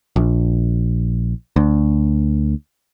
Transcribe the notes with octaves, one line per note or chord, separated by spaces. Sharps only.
A#1
D2